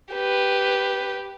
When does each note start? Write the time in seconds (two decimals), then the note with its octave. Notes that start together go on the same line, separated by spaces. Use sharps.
0.13 G4 B4